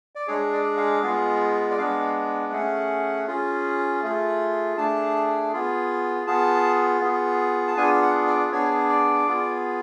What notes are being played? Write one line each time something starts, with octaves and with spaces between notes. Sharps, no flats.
D5
G#3 D4 G#4 C#5
D5
F5
G#3 B3 F4 G#4
D5
G#3 B3 D4 F5
A3 C#4 G#4 F#5
C#4 F4 G#4
A3 F4 G#4
A3 D4 G#4 A5
B3 F4 G#4
B3 F4 G#4 A5
B3 F4 G#4
A5
B3 D4 F4 G#4 G#5
F#5
D5
B3 D4 G#4 C#5
D5
B3 F4 G#4